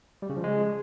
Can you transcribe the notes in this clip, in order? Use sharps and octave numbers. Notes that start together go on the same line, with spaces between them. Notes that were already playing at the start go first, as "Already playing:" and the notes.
G3
C#3
F3
G#3